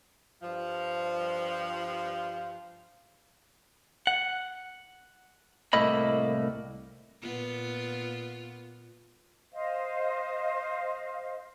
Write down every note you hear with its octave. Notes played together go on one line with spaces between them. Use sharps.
G2 F3
F#5
C2 A2 A3 A#3 D#5 B5
A#2 B3 F4
C5 D#5 F5